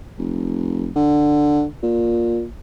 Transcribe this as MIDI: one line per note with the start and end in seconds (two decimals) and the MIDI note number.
0.18 0.90 29
0.96 1.65 50
1.83 2.45 46